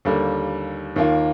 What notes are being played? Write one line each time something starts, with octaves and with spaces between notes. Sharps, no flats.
D#2 D3 G3 A#3
D#2 D#3 A#3 F4